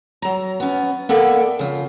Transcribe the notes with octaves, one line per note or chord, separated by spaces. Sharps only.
F#3 A#5
B3 C#4
A#3 B3 A4 D5 E5 G5
C#3 F4